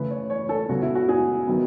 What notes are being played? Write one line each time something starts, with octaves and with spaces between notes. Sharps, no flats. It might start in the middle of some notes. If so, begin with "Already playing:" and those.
Already playing: C#3 E3 A3 B4
C#5
C#5
A4
C#3 F#3 B3 F#4
E4
F#4
G#4
D#3 F#3 B3